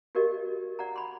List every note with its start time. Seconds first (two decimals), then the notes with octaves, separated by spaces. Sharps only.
0.15 F#4 G4 A#4 D5 D#5
0.79 D5 F#5 A#5
0.96 B5 C6